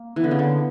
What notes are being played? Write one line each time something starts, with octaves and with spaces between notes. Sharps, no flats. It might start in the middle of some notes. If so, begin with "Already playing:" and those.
Already playing: A#3
E3 B3
D3
C#3
D3